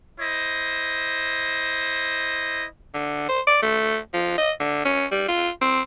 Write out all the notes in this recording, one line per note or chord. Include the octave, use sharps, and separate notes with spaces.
E4 C5 D#5
D3
C5
D5
A3
F3
D#5
D3
C#4
G3
F4
C4